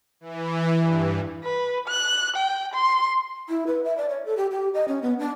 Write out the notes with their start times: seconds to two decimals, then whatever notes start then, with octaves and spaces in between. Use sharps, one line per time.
0.20 E3
0.78 G2
1.44 B4
1.88 F#6
2.36 G5
2.74 C6
3.49 E4
3.67 B4
3.84 E5
3.97 D5
4.09 C#5
4.25 A4
4.37 G4
4.51 G4
4.74 D#5
4.88 C#4
5.02 B3
5.19 D4